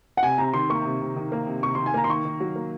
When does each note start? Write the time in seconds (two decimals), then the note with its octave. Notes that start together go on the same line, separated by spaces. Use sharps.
0.17 F#5
0.23 C3 G#5
0.38 C3 A#5
0.54 D#3 C6
0.70 A#3 C#6
0.85 C3
1.01 C3
1.16 D#3
1.32 A#3
1.47 C3
1.63 C3 C#6
1.75 D#3 C6
1.86 G#5
1.94 A#3 A#5
2.04 C6
2.10 D#3 C#6
2.25 D#3
2.40 F#3
2.56 A#3